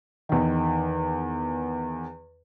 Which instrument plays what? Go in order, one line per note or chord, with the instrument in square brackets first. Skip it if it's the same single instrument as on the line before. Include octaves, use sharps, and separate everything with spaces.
[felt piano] E2 D#3